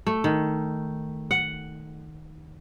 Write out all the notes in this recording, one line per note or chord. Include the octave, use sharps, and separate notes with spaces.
A3
D#3
F#5